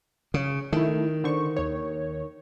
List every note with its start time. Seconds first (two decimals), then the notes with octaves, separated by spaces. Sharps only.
0.34 C#3
0.72 D#3 A3 E4
1.24 D3 C5 C#6
1.56 D#2 C#5